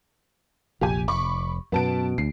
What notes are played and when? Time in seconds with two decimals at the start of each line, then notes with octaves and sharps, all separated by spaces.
0.81 F1 A#1 G4 G#5
1.08 F1 B5 C#6 D6
1.72 F#2 B2 B3 A5 D7
2.18 D2 C7